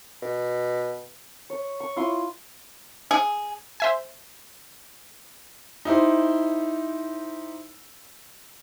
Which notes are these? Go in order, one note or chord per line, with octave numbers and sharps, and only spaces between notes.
B2
C#5
C#6
E4 F4 C6 D#6
G#4
C5 E5 G#5
D#4 E4 G4 C5